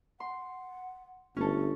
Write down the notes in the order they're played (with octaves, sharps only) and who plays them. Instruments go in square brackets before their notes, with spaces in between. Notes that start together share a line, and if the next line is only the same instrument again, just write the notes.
[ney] F#5 [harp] C6
[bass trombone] G1 [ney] A3 [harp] C#4 A4